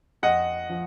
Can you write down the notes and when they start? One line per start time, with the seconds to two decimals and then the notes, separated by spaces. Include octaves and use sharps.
0.23 F2 D#5 F#5
0.69 F3